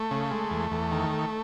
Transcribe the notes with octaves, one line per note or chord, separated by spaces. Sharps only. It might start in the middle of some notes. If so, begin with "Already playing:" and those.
Already playing: A3
C#3
G#3
E2
E2
D#3